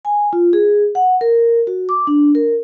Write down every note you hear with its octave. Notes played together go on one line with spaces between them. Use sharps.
G#5
F4
G#4
F#5
A#4
F#4
D6
D4
A#4